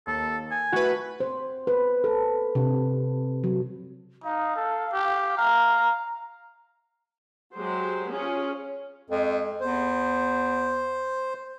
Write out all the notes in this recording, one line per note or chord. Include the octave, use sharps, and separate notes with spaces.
D#2 A4
G#5
A3 F#4 B4
C5
B4
A4
C3
F#3
D#4 F5
A4
G4
F5 A#5
F#3 G#3 G4 C5
C#4 F4 G#4
F2 G#3
E2 C5